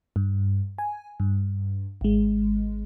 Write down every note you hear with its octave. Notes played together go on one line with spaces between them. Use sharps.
G2
G#5
G2
G#1 G#3